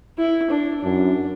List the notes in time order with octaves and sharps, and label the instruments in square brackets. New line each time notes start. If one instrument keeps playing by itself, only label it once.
[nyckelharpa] E4
D4
[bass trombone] F#2 [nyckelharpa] D4